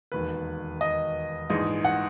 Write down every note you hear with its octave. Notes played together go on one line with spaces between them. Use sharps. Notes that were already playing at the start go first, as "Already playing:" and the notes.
E1 D#2 D#3 B4
D#5
A#1 G#2 E3 D#5
F#5